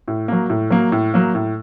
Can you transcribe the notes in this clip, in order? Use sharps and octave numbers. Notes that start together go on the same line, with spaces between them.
A2
F#3 A#3
A2
F#3 A#3
A2
F#3 A#3
A2